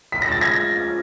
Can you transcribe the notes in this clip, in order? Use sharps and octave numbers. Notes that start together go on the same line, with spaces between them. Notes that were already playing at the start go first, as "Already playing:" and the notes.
G#3 C#4 F4 A#4 B6
A#6
A6
G#6 A#6
F3 A#3 C#4